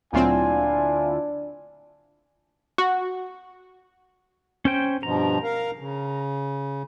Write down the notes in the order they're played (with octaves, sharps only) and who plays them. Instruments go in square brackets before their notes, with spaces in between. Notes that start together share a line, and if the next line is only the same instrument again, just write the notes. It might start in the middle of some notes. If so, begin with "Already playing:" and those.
[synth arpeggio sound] D2 E4 F4 [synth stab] A#2 F#3 C4 [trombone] D4 [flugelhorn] G#5
[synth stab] F#4
[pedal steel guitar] C#4 C5 G5
[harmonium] G2 B2 F3 [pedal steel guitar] A#5
[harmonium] A#4 F5
C#3